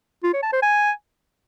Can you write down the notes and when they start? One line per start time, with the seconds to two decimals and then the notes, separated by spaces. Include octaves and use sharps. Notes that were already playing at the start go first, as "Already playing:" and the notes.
0.24 F4
0.33 C#5
0.43 A5
0.53 C5
0.62 G#5